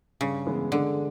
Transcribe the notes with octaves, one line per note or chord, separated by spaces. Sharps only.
G2 C#3
E3 G#3 B3
D3 G#3